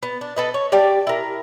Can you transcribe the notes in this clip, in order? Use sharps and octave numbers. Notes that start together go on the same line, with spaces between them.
B3
D4
A4 B4 D#5
C#5
G4 D5 G5 A5
E4 A#4